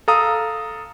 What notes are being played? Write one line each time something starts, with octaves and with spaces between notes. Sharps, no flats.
A4 F5 A#5 D#6